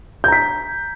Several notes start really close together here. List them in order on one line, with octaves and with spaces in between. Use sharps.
G6 A#5 B6